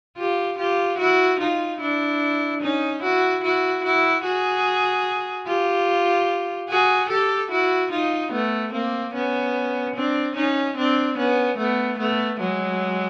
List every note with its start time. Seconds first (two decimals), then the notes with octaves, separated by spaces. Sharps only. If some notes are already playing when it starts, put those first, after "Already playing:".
0.17 F4 G4
0.58 F4 G4
0.98 E4 F#4
1.40 D#4 F4
1.80 D4 E4
2.61 C#4 D#4
3.03 E4 F#4
3.43 E4 F#4
3.84 E4 F#4
4.24 F#4 G#4
5.47 F4 G4
6.69 F#4 G#4
7.09 G4 A4
7.51 E4 F#4
7.91 D#4 F4
8.32 A3 B3
8.73 A#3 C4
9.14 B3 C#4
9.95 C4 D4
10.35 C#4 D#4
10.77 C4 D4
11.17 B3 C#4
11.58 A3 B3
11.98 A3 B3
12.40 F#3 G#3